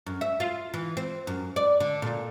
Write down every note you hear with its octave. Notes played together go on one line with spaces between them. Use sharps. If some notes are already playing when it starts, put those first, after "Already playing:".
F#2
E5
F4
E3
C4
F#2
D5
D3
A#2